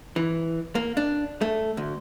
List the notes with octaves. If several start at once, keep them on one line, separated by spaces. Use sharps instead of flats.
E3
A#3
D4
A3
D2